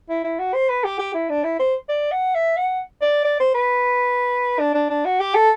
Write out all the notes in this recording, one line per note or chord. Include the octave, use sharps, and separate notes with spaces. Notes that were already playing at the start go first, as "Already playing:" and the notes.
E4
E4
F#4
C5
B4
G4
G4
E4
D4
E4
C5
D5
F#5
E5
F#5
D5
D5
C5
B4
D4
D4
D4
F#4
G4
A4